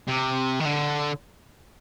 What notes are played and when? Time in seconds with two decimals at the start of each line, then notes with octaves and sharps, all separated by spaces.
0.08 C3
0.60 D#3
0.66 D3